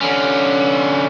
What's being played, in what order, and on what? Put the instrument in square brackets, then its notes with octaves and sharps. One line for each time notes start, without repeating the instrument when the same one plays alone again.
[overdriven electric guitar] D3 C#4